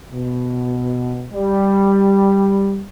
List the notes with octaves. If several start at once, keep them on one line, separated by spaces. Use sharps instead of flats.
B2
G3